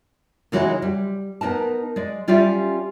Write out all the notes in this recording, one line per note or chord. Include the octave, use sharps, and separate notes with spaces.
C#3 E3 G#3 D#4 F#4 C#5
G3
B3 D#4 A#4 A5
G#3 D5
G3 C#4 F4 G4 D5 E5